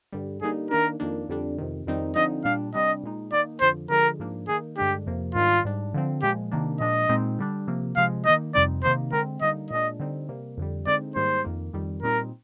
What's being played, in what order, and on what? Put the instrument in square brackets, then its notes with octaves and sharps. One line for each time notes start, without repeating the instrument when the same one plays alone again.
[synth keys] G2 D3 G3
[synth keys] D3 G3 A#3 D#4 [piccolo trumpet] G#4
[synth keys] D#3 A#3 D4 [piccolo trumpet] A#4
[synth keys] F2 D#3 A#3 D4
F2 D3 G3 D4
F2 C3 D#3
F2 D#3 G3 C4 D#4
[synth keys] D3 F3 C4 D#4 [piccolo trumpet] D#5
[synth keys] A#2 G3 D4 [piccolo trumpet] F5
[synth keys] C3 G3 D4 [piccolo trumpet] D#5
[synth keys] A#2 G#3 D#4
[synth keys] D#3 A#3 D#4 [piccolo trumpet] D5
[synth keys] F2 D3 F3 [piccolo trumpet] C5
[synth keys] D3 F3 G#3 [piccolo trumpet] A#4
[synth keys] G#2 F3 A#3 D4
[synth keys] D#3 A#3 D#4 [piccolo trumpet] G#4
[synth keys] G2 D3 G#3 D4 [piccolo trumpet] G4
[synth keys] F2 C3 F3 A#3
[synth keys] G#2 D#3 G3 D4 [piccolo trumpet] F4
[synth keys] G#2 G3 D4
D3 F3 C4
[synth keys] A#2 F3 G#3 [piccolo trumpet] G4
[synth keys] C3 D#3 A#3 D4
[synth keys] A#2 F3 G#3 D4 [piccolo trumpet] D#5
[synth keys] A#2 G#3 C4 D#4
D3 G3 D4
C3 F3 A#3
[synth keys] C3 F3 G#3 [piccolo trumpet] F5
[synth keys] D#3 A#3 D#4 [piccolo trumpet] D#5
[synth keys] F2 C3 G3 C4 D#4 [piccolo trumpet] D5
[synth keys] C3 D#3 A#3 D#4 [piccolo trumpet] C5
[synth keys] D3 G#3 C4 [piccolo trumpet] A#4
[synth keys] D3 G3 A#3 D#4 [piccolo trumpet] D#5
[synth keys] A#2 G#3 D4 [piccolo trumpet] D#5
[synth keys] D3 G3 C4 D#4
C3 G3 A#3
F2 D3 G3
[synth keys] D3 G#3 C4 D#4 [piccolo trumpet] D5
[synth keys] G#2 D#3 G3 A#3 [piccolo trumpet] C5
[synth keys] F2 D#3 A#3
F2 D#3 G3
[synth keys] A#2 G3 C4 D#4 [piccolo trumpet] A#4